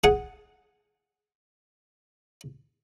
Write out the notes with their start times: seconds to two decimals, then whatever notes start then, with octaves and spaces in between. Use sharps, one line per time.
0.04 G#4 F#5